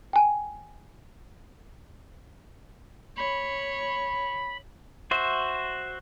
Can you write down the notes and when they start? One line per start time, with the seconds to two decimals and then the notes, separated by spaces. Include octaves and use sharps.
0.13 G5 G#5
3.17 C#5 B5
5.11 F#4 C5 E5